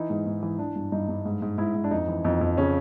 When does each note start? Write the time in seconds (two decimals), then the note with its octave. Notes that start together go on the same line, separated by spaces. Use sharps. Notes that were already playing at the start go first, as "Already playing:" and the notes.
Already playing: E3 D#4
0.10 G#2
0.26 G#2
0.43 E3
0.59 E3 D4
0.76 G2
0.92 G2 D#4
1.09 G2
1.25 G#2
1.42 G#2
1.58 G#2 E4
1.75 G#2
1.84 D4
1.91 F2 D#4
2.08 E3
2.24 F2 D#4
2.41 F2
2.57 C#3 C#4